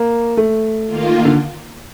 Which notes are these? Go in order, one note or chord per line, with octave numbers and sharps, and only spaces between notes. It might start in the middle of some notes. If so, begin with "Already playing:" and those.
Already playing: A#3
A3
D#3 A#3 F4
D3